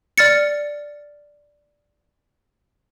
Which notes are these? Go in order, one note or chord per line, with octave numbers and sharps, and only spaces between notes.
D5 F6 A6 C#7